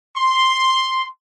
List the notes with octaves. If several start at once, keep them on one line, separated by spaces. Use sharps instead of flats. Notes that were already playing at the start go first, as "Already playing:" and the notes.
C6